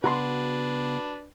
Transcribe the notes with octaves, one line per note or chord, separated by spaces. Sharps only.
C#3 B3 D4 F#4 B4 A#5 C6